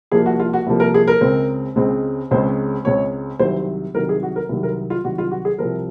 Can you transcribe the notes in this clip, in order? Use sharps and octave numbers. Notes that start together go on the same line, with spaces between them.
C2 C3 F3 A#3 G#4
F#4
F4
F#4
C2 C3 F3 A#3
A#4
G#4
A#4
C#2 C#3 G#3 C4
C#2 C#3 G#3 C4
C#2 C#3 G#3 C4 C5
C#2 C#3 G#3 C4 C#5
C2 C3 D#3 F#3 C5
C2 C3 D#3 F#3 A#4
G#4
F#4
A#4
C2 C3 D#3 F#3
A#4
F4
C2 C3 D#3 F#3 F#4
F4
F#4
G#4
C2 C3 F3 C4 A#4